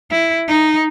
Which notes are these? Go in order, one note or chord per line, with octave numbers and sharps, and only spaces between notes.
E4
D#4